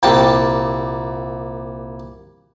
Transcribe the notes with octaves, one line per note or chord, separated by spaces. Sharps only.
C2 A#2 G3 G5 A5